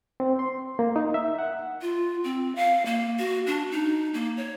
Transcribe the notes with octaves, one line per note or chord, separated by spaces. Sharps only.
C4
C6
A#3
D#4
E5
F#5
F4
C4
F5
A#3
F#4
D4
D#4
A#3
C#5